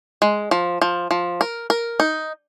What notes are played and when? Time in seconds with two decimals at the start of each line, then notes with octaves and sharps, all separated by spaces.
0.22 G#3
0.51 F3
0.82 F3
1.11 F3
1.41 A#4
1.70 A#4
2.00 D#4